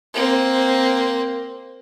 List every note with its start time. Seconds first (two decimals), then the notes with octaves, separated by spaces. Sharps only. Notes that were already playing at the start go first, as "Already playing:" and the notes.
0.14 A#3 C4